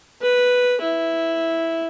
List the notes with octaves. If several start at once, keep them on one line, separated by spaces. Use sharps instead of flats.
B4
E4